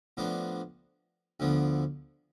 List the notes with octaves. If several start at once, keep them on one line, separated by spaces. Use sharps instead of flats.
A2 F3 B3 D4
D2 D3 F3 B3